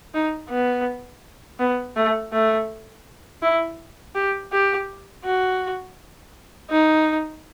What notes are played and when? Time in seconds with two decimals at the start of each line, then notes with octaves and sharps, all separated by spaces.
0.14 D#4
0.50 B3
1.60 B3
1.96 A3
2.33 A3
3.42 E4
4.15 G4
4.52 G4
5.25 F#4
6.70 D#4